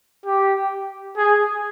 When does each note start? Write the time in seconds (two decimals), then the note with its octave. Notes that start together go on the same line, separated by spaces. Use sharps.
0.26 G4
1.17 G#4